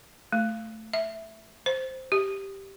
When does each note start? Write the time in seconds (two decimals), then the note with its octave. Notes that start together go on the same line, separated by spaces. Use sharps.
0.32 A3
0.93 E5
1.66 C5
2.12 G4